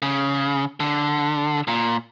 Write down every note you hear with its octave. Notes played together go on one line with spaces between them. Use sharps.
C#3
D3
A#2